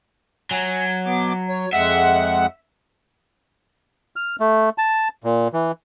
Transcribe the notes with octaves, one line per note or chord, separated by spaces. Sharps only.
F#3 G#5
B2 B3 D6
C#5
F2 G#3 E5 F#5
F6
A3
A5
A#2
E3